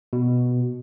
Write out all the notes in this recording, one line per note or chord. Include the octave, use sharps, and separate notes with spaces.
B2